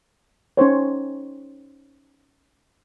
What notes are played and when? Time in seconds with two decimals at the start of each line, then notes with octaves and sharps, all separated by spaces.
0.57 C#4 D#4 C5 C#5